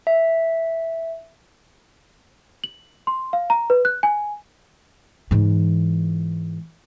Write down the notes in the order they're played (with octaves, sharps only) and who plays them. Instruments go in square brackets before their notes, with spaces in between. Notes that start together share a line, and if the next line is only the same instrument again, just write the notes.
[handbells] E5
[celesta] F#7
C6
F5
A#5
B4
F#6
G#5
[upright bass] G#2 E3